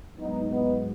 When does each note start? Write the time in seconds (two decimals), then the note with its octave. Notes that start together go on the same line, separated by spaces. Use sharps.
0.18 G#2 F#3 B3 D#4
0.49 B3 D#4